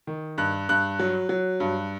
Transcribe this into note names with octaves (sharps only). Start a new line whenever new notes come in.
D#3
G2 F#6
G2 F#6
F#3
F#3
G2